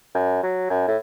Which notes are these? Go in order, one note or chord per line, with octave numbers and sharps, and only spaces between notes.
F#2
F#3
F#2
A2